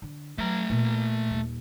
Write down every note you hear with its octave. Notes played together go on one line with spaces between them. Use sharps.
D3
F#3 A3 A#5
A#2
D#1